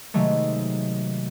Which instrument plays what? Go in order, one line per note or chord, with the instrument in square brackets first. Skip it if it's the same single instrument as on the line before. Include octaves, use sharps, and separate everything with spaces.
[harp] C3 D#3 F#3 G#3 A3